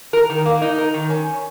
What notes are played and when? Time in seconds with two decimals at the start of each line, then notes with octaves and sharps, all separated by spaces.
0.13 A#4
0.30 D#3
0.46 A#3
0.62 D#4
0.78 A#4
0.94 D#3
1.10 C#4